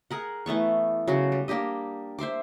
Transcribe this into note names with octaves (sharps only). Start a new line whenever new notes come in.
G#4 A#4 F#5
E3 A3 B3 C#6
C#3 F#3 F#4
G3
A#3 D4 G4 D#5
C5 E5 C6 D6